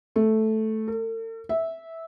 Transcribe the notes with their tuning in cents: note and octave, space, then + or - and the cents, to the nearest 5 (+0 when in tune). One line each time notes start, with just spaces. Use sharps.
A3 -5
A4 +45
E5 -10